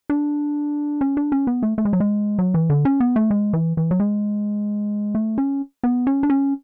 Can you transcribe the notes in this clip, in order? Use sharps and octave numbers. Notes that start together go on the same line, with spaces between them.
D4
C#4
D4
C#4
B3
A3
A3
G#3
F#3
G#3
F#3
E3
D3
C#4
B3
A3
G#3
E3
E3
F#3
G#3
A3
C#4
B3
C#4
D4
C#4